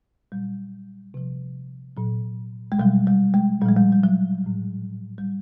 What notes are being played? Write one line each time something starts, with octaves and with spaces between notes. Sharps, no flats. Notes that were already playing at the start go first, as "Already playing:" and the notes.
A#2 F#3 G3
C3 F3
A#2 F#3
G#3
B2 F#3 G3
G3
G#3
A#2 F3 G3 G#3
G3
G3
F#3
A2 F3
G3